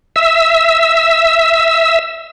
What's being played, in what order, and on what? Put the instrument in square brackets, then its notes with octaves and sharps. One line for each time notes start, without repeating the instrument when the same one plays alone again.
[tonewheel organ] E5 E6